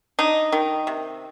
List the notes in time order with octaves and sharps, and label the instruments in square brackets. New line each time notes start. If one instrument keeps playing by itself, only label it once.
[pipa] D4 D#4
D#3
C3